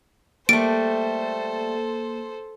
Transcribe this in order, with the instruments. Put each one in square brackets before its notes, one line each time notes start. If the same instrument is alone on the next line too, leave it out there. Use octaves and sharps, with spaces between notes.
[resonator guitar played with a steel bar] G3 A3 [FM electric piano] A#3 [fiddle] A4 C5 [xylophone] D7